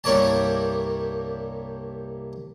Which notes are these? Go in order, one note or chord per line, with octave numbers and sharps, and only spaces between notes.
C2 G2 A#3 C#5 D5 A5